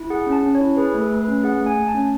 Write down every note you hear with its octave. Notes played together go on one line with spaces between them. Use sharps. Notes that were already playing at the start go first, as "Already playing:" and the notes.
Already playing: E4
G#4 F#5
C#4
A5
C#4
C#5
E4
G#4 B4
A3
A4
A3
B4
C#4
G#4 F#5
A3
G#5
A3
A5
C#4